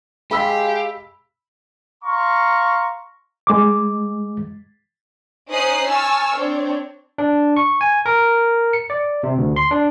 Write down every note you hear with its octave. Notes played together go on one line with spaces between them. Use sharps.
G#3 G4 F5 B5 E6 B6
F5 A#5 C6 C#6
G#3 D6
C#4 D#4 C5 D#6 F#6 C7
G#5 A5 C#6 E6 F6
C4 D4 C#5
D4
C#6
G#5
A#4
C#7
D5
C3
D2
C6
D4